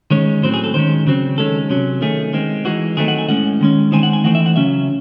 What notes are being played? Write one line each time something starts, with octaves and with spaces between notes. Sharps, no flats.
D#3 G#3 C#4 C#5
A2 F#3 C4 C5
G#4
A4
D#3 G#3 C#4 C5
C#3 F#3 C4
D#3 G#3 C#4 A4
C3 F#3 C#4
D#3 A3 C#4 G#4
D#3 G#3 C4
E3 G#3 D#4 F#4
D#3 F#3 A3 C4 D#4 G#4
F#5
G#5
A2 G#3 C#4 F#5
D#3 G#3 C#4
D#3 G#3 C4 D#4 G#5
F#5
G#5
E3 A3 C4 D#4 F#5
E5
F#5
C#3 F#3 C#4 E5